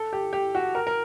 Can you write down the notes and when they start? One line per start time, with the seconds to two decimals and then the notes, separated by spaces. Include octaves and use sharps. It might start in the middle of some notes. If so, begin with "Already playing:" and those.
Already playing: A4
0.13 G4
0.33 G4
0.55 F#4
0.75 A#4
0.87 A#4